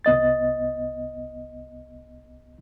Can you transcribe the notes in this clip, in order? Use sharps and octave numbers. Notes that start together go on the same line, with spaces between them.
C2 B3 D#5 A6